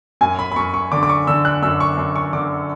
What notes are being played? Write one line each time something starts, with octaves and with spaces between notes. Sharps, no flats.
F#2 G#5
B5
B5
F#2 C#6
C#6
D3 D6
D6
C#6
D3 E6
F#6
F#2 E6
C#6
F#2
C#6
D3 D6